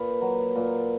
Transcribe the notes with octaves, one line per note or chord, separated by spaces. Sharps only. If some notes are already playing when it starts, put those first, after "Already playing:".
Already playing: A#2 B4
F#3
A#2